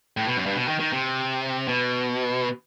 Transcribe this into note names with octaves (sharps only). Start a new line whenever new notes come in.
A2
B2
F#2
G2
B2
D#3
D#3
C3
B2